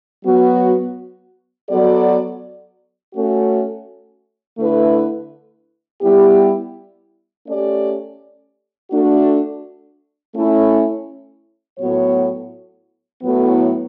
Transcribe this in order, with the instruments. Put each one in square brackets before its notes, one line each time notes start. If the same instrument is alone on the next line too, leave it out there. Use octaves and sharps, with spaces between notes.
[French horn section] F#3 B3 F#4
F#3 B3 F#4 A4 D5
A3 C#4 F#4
D3 A3 E4 B4
G3 B3 E4 G4
A3 C#4 G4 D5
A3 D4 F#4
A3 C#4 E4
A2 F#3 B3 F#4 C#5
A2 F#3 B3